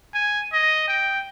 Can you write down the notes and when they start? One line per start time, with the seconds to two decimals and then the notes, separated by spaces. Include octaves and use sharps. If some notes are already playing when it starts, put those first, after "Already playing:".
0.14 G#5
0.53 D#5
0.88 G5